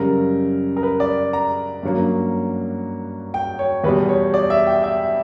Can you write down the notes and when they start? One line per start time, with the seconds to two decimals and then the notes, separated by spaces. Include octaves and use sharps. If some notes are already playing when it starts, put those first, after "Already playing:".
Already playing: F#2 C#3 G3 A#4
0.77 A#4
0.83 B4
1.00 D5
1.33 A#5
1.83 G2 F#3 A#3 C#4
3.34 G5
3.59 C#5
3.84 E2 B2 G3 B4
4.09 C#5
4.34 D5
4.50 E5
4.67 G5
4.84 E5